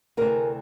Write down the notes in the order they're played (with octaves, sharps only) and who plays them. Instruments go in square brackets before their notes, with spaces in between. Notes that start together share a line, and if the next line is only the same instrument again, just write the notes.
[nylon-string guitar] D2 C3 E3 A3 G#4 A#4